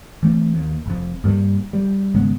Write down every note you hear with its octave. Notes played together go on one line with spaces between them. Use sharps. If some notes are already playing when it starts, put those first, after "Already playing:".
E3 A3 C4
D#2
F1 F2
G2 A#2 F#3 G3
G3
G#1 C#3 G#3 B3